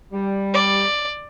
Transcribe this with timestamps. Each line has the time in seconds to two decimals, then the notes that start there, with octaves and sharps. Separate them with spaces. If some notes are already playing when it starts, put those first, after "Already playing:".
0.13 G3
0.54 D5